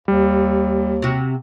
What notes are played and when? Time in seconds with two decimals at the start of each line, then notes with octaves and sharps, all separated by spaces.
0.08 D#2 G3
1.02 C3 F#4